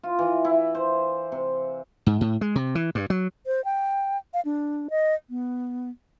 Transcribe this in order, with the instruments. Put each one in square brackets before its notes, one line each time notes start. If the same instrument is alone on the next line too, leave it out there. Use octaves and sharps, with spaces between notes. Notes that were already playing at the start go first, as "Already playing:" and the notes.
[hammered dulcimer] F4
E3
E4
C5
C3
[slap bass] G#2
A2
G#3
C3
E3
G2
F#3
[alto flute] C5
G5
F5
D4
D#5
B3